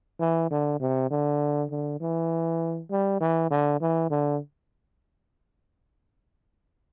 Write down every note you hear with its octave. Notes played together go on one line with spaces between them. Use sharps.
E3
D3
C3
D3
D3
E3
G3
E3
D3
E3
D3